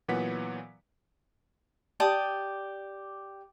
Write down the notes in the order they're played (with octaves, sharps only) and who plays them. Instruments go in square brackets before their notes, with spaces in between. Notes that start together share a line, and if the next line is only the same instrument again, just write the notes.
[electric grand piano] A#2 E3 F#3 B3 F#5 B6
[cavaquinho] G4 D5 A5 D#6